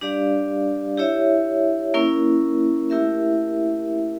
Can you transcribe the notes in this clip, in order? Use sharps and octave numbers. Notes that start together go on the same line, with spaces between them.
G3 D4 G4 D5 F5
E4 G4 C#5 E5
A#3 C#4 E4 A#4
A3 E4 G4 A#4 E5